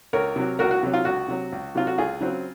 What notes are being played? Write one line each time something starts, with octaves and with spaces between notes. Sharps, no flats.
C#2 A#4 C#5
C3 F#3
C#2 F#4 A#4
F#4
C3 F#3
F4
C#2 F#4
C3 F#3
C#2
C3 F#3 F4
F#4
C#2 F4 G#4
C#3 F#3 C4